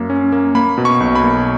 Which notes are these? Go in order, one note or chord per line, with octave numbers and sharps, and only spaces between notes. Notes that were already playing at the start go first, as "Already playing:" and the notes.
Already playing: F#2 A#3
C#4
A#3
A#3 B5
B2
C#6
B1
B5
A#3